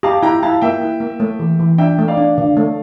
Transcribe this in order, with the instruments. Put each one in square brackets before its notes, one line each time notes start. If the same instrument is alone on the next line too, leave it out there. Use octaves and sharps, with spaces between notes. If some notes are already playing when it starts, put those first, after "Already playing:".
[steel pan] G4 [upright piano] F5 A5
[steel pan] E4 [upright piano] G5 A#5
[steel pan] E4 [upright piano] F5 A5
[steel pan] A#3 [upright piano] E5 G5
[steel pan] E4
A#3
A3
E3
E3
[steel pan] D4 [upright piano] E5 G5
[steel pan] A3
[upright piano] D5 F5
[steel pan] D4
D3
A3